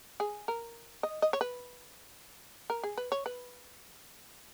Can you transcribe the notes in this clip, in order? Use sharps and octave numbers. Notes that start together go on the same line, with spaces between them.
G#4
A#4
D#5
D#5
C#5
B4
A#4
G#4
B4
C#5
B4